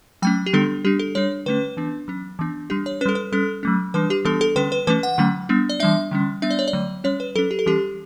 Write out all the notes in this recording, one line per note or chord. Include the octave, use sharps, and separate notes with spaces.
F#3 A3 C#4 G5
G4
D3 G3 B3 D4 A4
G3 D4 G4
A4
G3 D4 C#5
D3 A3 C#4 B4
E3 B3 D4
F#3 C#4
E3 B3 D4
G3 D4 G4
C#5
G3 C#4 A4 B4
B4
G3 C#4 A4
F#3 A3 C#4
E3 G3 D4 B4
G4
E3 G3 B3 D4 A4
A4
D3 G3 C#4 B4
B4
E3 A3 C#4 B4
F#5
D3 F#3 A3 C#4
G3 B3 D4
D5
E3 G3 D4 E5
D3 G3 C#4
G3 B3 D4 E5
D5
C#5
D5
D3 F#3 A3
G3 C#4 C#5
B4
F#3 C#4 A4
G4
A4
E3 G3 C#4 G4